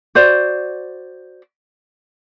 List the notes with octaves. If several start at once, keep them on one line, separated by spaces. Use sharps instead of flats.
F#4 C5 D5